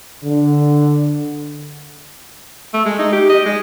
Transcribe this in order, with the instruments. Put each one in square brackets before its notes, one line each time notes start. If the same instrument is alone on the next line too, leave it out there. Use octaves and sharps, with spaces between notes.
[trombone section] D3
[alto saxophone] A3
G#3
D#4
G4
D#5
G#3